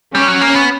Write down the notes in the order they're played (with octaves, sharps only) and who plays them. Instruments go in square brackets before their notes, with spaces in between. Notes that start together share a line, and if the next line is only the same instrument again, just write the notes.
[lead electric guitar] G3 [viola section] C#4
[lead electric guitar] F#3
A#3
B3